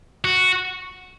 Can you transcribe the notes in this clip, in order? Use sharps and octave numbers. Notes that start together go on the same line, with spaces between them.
F#4